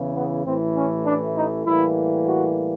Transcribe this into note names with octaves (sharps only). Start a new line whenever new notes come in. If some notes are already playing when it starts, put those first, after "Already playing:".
Already playing: E2 C#3 E3
B3
A1 A2 E3 A3 C4
C#4
D4
D#4
A2 E3 G3 A#3 E4
F#4